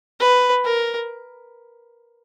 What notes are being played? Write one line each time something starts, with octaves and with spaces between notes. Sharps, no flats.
B4
A#4